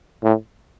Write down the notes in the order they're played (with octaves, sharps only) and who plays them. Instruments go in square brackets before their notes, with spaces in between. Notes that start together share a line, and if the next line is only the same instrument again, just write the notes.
[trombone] A2